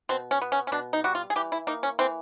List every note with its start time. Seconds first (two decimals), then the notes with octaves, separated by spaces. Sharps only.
0.09 B2 C4
0.31 C#4
0.42 B3
0.52 C#4
0.67 C#4
0.72 B2 D4
0.93 D#4
1.04 G3 F#4
1.15 F4
1.30 G#4
1.36 E3 G4
1.52 E4
1.67 A#3 D#4
1.83 C#4
1.99 E3 C4